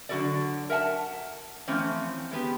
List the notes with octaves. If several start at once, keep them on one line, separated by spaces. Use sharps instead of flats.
D3 F#3 F4 F#4 A4 D5
A#4 E5 F#5 G#5 A5
E3 F3 A3 C4 C#4
G#3 B3 G4